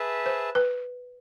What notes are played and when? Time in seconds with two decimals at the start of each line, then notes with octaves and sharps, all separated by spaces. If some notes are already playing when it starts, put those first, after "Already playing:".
Already playing: G#4 B4 E5 A5
0.26 C5
0.55 B4